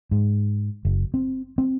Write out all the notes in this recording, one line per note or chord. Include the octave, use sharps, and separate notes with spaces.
G#2
F#1
C4
C4